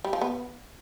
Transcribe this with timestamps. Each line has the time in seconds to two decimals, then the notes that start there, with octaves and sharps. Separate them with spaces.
0.04 G3
0.13 F3
0.21 B3